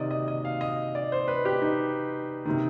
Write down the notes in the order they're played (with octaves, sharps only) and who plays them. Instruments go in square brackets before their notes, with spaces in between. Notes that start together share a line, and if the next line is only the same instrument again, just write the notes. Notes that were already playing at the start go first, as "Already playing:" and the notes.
Already playing: [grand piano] C3 D#3 D5 D#5
D#5
D#5
F5
D#5
D5
C5
B4
G4
D#4
C3 D#3